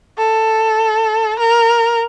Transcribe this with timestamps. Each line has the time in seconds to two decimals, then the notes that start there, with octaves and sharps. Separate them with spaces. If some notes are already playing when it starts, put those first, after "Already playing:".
0.18 A4
1.39 A#4